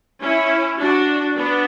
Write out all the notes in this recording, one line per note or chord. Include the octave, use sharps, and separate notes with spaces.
C#4 E4
D4 F#4
B3 D4